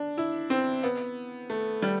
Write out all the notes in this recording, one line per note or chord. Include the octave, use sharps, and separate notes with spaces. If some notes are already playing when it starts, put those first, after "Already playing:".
Already playing: D4
E4
C4
B3
A3
G3